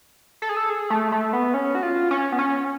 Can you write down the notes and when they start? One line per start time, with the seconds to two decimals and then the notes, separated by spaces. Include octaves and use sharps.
0.42 A4
0.49 G#4
0.57 A4
0.70 G#4
0.90 A3
1.12 A3
1.33 B3
1.54 C#4
1.75 F#4
1.83 F4
2.11 C#4
2.32 B3
2.39 C#4